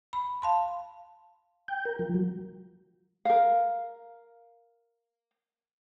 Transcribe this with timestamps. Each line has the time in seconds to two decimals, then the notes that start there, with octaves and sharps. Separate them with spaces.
0.13 B5
0.42 F5 A5 C6
1.68 G5
1.85 A#4
1.99 F3
2.14 F#3
3.25 A#4 F5